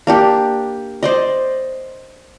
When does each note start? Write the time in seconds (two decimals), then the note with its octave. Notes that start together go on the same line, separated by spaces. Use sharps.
0.07 A#3 D4 G4
1.03 C5 D5 D#5